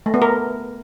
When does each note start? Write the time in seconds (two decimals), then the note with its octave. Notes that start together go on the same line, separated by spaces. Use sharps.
0.06 A3
0.14 B3
0.22 A#4